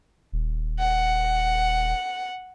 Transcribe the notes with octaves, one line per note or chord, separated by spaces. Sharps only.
D#1
F#5